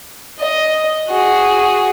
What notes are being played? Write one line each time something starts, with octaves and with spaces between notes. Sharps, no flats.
D#5
F#4 G#4